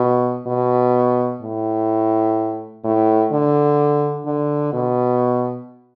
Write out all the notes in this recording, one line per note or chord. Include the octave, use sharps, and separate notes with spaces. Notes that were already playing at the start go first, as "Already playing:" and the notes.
Already playing: B2
B2
A2
A2
D3
D3
B2